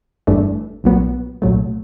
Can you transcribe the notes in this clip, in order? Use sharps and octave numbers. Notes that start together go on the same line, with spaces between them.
G1 G2 E3 A3 D4
B1 A#2 F#3 B3
C2 A#2 F#3 A3